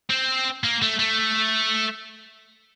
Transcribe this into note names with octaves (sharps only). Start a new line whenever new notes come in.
C4
A#3
A3
A3